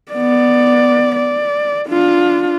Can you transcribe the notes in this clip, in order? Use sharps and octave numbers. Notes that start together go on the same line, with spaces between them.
B3 D5
D5
D4 F4